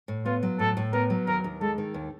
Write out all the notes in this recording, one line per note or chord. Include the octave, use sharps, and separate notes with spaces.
A2
B3 F4
F#3
A2 A4
A2
B3 A#4
F#3
D#2 A#4
D#2
G#3 A4
D#3
D#2